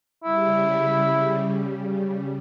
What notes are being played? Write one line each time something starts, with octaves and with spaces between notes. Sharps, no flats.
C#3 G3 E4